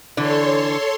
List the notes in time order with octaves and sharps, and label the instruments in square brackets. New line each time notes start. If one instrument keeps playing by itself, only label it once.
[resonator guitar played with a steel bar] D3 E3 [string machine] A4 C#5 C6